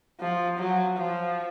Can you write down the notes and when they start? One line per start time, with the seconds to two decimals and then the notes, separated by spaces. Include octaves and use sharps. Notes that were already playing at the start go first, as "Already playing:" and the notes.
0.20 F3
0.58 F#3
0.98 F3